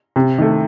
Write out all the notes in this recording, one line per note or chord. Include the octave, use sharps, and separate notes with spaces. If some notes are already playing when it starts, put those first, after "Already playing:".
C3
D#3 A3